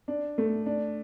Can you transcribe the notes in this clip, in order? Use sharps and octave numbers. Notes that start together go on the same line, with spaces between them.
D4
A3
D4